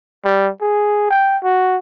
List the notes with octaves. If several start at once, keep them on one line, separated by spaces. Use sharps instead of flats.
G3
G#4
G5
F#4